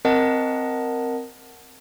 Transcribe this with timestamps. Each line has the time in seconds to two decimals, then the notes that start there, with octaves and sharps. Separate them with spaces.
0.05 C4 A#4 D#5 F#5 A5